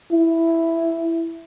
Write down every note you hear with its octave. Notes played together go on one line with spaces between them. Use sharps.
E4